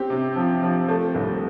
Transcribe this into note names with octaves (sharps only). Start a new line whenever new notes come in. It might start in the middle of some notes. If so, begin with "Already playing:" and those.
Already playing: C4 G4
C3
F3
F3
A3
C2